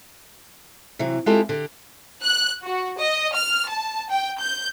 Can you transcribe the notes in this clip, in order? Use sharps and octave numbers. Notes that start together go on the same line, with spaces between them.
C3 E3 F#3
G#3 C4 E4 F4 G4 A4
D3 G4
F#6
F#4
D#5
F6
A5
G5
G6